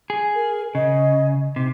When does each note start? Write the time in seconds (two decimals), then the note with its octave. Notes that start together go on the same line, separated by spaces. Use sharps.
0.10 G#4
0.35 A#4
0.75 C#3 D#5
1.56 C3 D#4